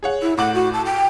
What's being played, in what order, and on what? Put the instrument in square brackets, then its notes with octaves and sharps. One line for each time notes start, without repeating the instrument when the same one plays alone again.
[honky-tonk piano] G#4 C#5 F#5
[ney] E4
[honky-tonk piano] A2 D6 F#7 [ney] F#5
[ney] F#4
A5
G5